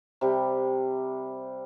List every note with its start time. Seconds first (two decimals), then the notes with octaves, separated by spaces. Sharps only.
0.21 C3 G3